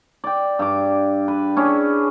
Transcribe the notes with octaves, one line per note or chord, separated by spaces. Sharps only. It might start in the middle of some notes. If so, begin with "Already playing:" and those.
D5 G5
G2 D6
B4
C#4 D4 E4 G#4